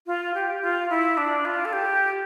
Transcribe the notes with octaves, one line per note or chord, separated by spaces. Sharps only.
F4
G4
F4
E4
D4
F4
A4
G4